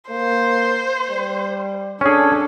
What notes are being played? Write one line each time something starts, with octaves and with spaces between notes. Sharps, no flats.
A#3 C5
G3
C#4 D4 G#4 A4